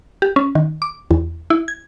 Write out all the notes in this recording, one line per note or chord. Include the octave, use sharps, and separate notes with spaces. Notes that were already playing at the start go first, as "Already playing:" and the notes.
G4
C#4
D#3
D6
E2
E4
G#6